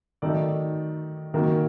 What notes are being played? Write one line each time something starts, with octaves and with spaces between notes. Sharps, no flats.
D#3 F#3 A3 D#4 A4 D5
A#2 D#3 F#3 A#3 F#4 A#4